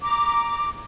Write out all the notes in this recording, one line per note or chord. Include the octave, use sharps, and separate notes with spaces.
A#5 D6